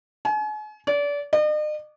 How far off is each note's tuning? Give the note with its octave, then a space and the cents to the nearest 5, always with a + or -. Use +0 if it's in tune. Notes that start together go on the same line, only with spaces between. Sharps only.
G#5 +40
D5 -30
D#5 -45